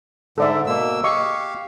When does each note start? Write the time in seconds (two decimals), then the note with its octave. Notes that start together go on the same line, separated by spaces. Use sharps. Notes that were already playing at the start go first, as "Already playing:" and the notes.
0.38 G#2 D3 A4 D5 E5
0.67 B2 A#3 E6
1.04 G4 D#5 F5 C#6 D#6